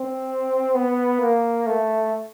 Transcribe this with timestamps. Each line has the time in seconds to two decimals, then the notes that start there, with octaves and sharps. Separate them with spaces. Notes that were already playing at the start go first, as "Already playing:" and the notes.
Already playing: C4
0.75 B3
1.20 A#3
1.66 A3